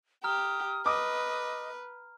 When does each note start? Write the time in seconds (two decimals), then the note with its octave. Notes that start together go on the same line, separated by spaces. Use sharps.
0.24 G4 A#5 D#6 F6
0.86 B4 D#5 D6 D#6